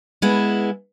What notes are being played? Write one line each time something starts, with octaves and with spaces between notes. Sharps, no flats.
G#3 B3 E4